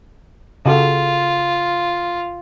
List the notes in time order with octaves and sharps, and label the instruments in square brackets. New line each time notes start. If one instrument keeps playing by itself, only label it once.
[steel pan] C#3 F#4 A4 [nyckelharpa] F4